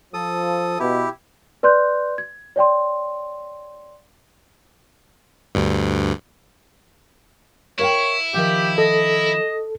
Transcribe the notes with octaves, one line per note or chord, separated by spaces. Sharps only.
F3 A4 D#6
B2 E4 G4
B4 D5 C6 F#6 G6
G#6
C#5 D5 G5 C6
D2 G2
E4 A#4 C#5 F5 G5
D#3 F3 G4 F5
A4 D#5